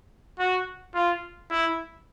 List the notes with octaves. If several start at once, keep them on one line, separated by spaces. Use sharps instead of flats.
F#4
F4
E4